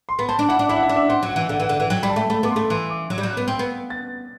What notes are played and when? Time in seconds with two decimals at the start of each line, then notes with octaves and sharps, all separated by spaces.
0.09 C6
0.19 B3 B5
0.29 C4 A5
0.39 D4
0.49 E4 F#5
0.59 D4
0.69 E4 E5
0.76 F#5
0.83 E5
0.89 D4
0.96 E5
1.09 C4 F#5
1.23 F#3
1.29 F#5
1.36 E3
1.49 D3 F#5
1.60 E3 F#5
1.69 D3
1.77 E3 F#5
1.90 F#3 G5
2.03 G3 B5
2.10 A5
2.16 A3
2.30 A3 B5
2.43 B3 D6
2.51 C6
2.56 A3
2.70 E3 C6
2.90 D6
3.10 F#3
3.18 G3
3.21 F#3 G6
3.30 F#6
3.37 B3
3.48 C4
3.59 B3
3.90 A6